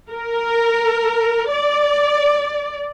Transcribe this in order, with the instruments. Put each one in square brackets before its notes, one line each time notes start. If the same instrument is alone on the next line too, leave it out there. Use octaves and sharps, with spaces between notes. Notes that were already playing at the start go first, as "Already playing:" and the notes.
[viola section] A#4
D5